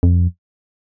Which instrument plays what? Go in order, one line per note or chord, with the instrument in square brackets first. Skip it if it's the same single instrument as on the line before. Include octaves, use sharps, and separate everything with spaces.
[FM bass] F2